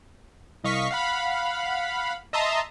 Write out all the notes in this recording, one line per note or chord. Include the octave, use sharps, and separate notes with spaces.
C2 D#5 F5 C#6 B6
F5 F#5 B5
D#5 E5 A5 A#5 C6 D#6